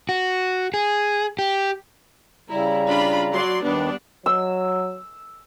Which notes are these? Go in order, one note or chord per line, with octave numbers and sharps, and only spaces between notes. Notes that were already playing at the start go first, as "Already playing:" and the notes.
F#4
G#4
G4
C#3 G3 E4 A#5
D4 F4 B5
F#3 D5 C6
D#2 D#3 G3 B3 D4 B4
F#3 E6